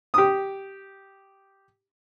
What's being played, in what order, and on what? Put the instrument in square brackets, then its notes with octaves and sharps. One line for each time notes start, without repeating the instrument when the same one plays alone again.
[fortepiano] G4 D#6